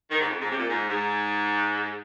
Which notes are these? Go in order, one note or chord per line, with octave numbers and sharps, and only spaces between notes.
D#3
G#2
F2
G#2
C3
A#2
G#2
G#2